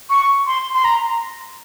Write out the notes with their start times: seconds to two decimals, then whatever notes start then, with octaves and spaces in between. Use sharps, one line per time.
0.10 C#6
0.47 C6
0.75 C6
0.85 A#5